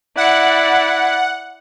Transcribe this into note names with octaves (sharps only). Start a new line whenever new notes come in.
E4 D5 F#5